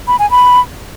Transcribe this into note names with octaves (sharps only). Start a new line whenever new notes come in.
B5
G#5
B5